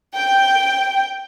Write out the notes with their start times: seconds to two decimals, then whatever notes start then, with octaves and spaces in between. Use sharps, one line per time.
0.15 G5